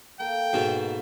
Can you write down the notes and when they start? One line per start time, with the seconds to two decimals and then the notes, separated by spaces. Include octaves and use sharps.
0.20 A#3 A4 G5
0.53 G#2 B2